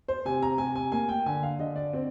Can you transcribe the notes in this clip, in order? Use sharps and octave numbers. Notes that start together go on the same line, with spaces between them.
C5
C3 G#5
A#5
C3 G#5
G#5
A#3 G#5
G5
D3 G#5
F5
D3 D#5
D5
C4